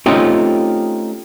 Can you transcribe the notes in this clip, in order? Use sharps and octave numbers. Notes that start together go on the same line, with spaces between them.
A3 C4 C#4 D#4 F4 G4